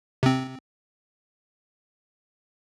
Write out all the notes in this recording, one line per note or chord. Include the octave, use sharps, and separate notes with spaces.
C3 C4